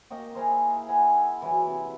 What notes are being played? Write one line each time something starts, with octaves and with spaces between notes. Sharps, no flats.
A#3 D#5 G5 C#6
E4 G#4 A#4 C5
B4 E5 F#5 G#5
E3 F#3 B4
C3